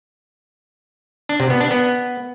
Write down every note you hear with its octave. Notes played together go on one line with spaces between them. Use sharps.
D4
C3
B3
D4
B3